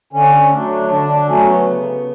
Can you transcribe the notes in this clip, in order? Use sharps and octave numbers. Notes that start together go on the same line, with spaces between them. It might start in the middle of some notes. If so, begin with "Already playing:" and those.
D3 C#4
F#3 A3 D4
D3 D4
D4
F#3 A3 C#4
B3
C#3